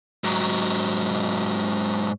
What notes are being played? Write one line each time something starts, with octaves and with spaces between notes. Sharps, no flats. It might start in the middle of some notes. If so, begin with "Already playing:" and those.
G#2 F#3